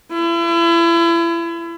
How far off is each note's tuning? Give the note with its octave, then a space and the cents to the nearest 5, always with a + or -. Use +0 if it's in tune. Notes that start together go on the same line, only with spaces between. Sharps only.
E4 +35